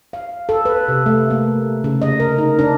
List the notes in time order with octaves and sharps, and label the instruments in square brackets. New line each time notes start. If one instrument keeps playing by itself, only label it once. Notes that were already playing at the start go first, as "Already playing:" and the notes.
[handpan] F5
A4
B4
C3
A3
A#3
C#3
D#5
A#4
D#4
D4